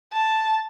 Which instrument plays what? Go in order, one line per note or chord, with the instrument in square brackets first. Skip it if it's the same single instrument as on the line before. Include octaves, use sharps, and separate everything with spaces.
[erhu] A5